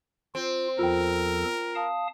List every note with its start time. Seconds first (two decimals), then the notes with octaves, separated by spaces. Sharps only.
0.35 C4 F4
0.79 E2 F3 F4 A4 A#4 G5
1.75 F5 A5 D#6